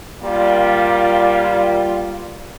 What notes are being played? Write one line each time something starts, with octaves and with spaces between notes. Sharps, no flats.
G3 A#3 F4